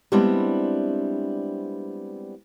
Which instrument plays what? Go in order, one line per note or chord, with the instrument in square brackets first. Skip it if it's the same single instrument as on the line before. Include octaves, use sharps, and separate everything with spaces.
[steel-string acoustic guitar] G3 G#3 B3 C4 D4 E4